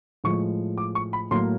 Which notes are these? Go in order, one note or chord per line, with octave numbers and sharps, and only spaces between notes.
A2 F3 G#3 C#6
D6
C#6
B5
A2 F#3 A#3 C6